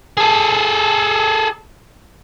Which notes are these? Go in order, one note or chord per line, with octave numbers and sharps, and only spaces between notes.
G#4 A4